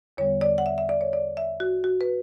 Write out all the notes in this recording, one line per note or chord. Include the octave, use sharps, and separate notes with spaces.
E2 D3 G3 B3 C#5
D5
F#5
E5
E5
D5
C#5
D5
E5
F#4
F#4
B4